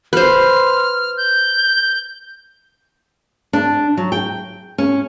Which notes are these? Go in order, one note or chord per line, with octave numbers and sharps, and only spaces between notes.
B4 C5 F6
G6
D4
F#3
G5
C#4